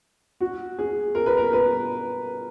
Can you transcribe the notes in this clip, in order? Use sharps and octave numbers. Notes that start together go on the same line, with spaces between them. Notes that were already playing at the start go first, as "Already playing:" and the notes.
F#4
G#4
A#4
B4
A#4
B4